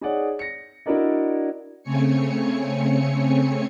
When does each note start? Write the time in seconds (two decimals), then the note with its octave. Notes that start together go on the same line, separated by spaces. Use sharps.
0.01 D#4 G#4 C#5 D5 F#5
0.39 A#6 C#7
0.86 D4 E4 F#4 A#4 D5 D#5
1.83 C#3 A3 C4 C#5 G#5 C#7